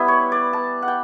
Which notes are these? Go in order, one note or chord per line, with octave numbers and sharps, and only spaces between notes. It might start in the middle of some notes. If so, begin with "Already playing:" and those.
Already playing: G3 B3 E4 B4
C#5
D5
A5
F#5
G5